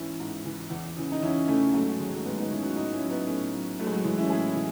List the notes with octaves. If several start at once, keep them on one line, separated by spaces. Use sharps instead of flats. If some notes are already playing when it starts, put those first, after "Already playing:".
Already playing: G#2 E3 C#4 E4
G#2
E3
E2
C#3 E3
D#4
E2 C#4 E4
C#3 E3 A3 C#4
G#2 F#3 A3
F#3
D#3 F#3 G#3
F#3 A3
G#2 G#3 B3
B3 D#4
D#3 F#3 C#4 E4
D#4 F#4
A2 D#4 F#4
C#4 E4
F#3
B3 D#4
A2 A3 C#4
F#3
A2 F#3 A3
G#3
F#3
E3 G#3
C#4 E4
A2 E4 G#4
E3